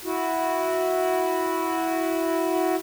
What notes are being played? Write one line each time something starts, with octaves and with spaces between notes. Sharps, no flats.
E4 F#4